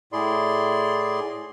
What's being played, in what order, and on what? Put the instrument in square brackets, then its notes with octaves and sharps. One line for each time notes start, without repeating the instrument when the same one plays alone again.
[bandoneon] A2 E4 G#4 D5 C6